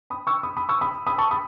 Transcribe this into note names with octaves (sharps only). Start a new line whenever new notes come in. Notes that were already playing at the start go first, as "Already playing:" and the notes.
B5 D#6
C#6 E6
B5 D#6
B5 D#6
C#6 E6
B5 D#6
B5 D#6
A5 C#6
B5 D#6